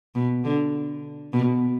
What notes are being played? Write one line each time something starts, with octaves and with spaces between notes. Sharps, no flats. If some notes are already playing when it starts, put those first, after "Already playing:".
B2
D3
B2